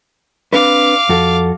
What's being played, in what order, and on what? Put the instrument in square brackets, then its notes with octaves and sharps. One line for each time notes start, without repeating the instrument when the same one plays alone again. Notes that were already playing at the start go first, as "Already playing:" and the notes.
[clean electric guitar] C4 D4 B4 [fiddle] F5 D6
[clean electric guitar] F2 F#4 A4